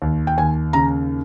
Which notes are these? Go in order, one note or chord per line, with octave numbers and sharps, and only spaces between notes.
D#2
G5
D#2 G#5
C#3 A#5